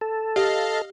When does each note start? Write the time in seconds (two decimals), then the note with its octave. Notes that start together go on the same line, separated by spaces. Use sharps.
0.01 A4
0.36 G4 D#5 F5 F6